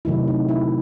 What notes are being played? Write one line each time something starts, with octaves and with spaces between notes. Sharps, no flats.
C3 D#3 F#3 A3 D#4 E4
D#4
E4